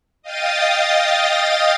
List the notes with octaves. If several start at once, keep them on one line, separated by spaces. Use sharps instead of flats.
D#5 F5 G5 D#6 A6